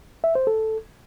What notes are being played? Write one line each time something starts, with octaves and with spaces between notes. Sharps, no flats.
E5
C5
A4